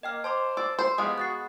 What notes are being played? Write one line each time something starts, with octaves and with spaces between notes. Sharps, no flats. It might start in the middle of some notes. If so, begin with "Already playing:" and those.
A#3 D#5 G5 F6
C5 A5 C6 D6
D5 E6
C5
E3 F3 G#3 B3 G4 F5 D#6
F#4 F#6 A6 C7